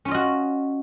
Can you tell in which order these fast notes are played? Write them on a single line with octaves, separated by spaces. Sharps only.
C#4 F4 D#5 F#4